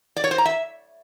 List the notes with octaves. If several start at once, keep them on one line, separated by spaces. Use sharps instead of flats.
D5
C#5
C5
A#5
E5